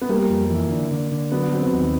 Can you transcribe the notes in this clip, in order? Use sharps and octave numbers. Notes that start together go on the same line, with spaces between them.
B3
G3 A#3
F2
E3
D3
D3
D3
F#3 B3
F#3 C4
B3
D#2